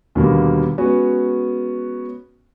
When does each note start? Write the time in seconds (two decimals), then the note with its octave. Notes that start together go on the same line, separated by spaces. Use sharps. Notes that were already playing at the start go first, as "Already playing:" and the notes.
0.15 D#2 B2 D3 G3 A#3
0.78 G#3 B3 C#4 F#4